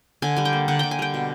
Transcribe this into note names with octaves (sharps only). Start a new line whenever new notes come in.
D3 G#5
G3 G#5
G5
A#3
D3 F#5
D3 G5
G#5
G3 G5
B2